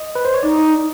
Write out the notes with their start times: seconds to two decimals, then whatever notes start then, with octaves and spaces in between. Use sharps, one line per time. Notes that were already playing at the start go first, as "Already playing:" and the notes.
Already playing: D#5
0.15 B4
0.25 C5
0.34 C#5
0.43 D#4 D5